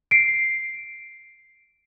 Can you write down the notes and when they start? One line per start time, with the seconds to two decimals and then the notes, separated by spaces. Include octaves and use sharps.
0.11 C7 D7